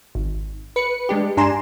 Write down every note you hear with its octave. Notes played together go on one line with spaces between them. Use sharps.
G#1
B4 C#7
G#3 D4 G4
G2 D4 G#5 A#5 C6 E7